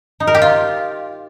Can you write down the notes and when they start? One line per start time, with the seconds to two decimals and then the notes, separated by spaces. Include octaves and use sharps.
0.20 D#4
0.27 A#4
0.34 G4
0.42 F4